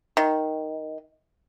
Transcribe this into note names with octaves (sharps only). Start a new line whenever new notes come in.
D#3